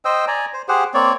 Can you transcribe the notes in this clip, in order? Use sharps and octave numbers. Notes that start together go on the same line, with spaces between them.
C5 D#5 G5 E6
D5 G#5 A#5
C5
G4 G#4 C5 F#5
A#3 C4 C#5 D5